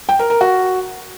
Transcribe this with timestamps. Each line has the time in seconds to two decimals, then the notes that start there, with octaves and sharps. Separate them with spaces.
0.09 G5
0.19 A#4
0.30 A#4
0.41 F#4